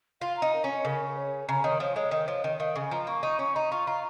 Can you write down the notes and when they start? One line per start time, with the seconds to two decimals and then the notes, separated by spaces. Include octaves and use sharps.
0.21 F4 F5
0.37 A#5
0.42 D#4
0.53 A#4
0.64 C#4 C#5
0.85 C#3 A#4
1.08 A#4
1.17 C#5
1.48 C#3 A#5
1.64 D#3 C#5
1.80 F3 C#5
1.96 G#3 C#5
2.11 D#3 A#4
2.28 F3 C#5
2.44 D#3 D#5
2.60 D#3 F5
2.76 C#3 G#5
2.91 F3 A#5
3.07 A#3 C#6
3.23 D#4 C#6
3.39 C#4 C#6
3.55 D#4 A#5
3.71 F4 C#6
3.87 F4 A#5